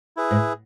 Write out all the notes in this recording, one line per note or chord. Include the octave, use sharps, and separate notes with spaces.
E4 G#4 B4
G#2